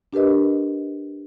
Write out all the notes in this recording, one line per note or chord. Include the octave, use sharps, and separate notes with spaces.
D4 G4 A#4 B4 D#5